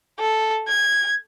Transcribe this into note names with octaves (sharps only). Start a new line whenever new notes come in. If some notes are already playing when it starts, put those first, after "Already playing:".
A4
G#6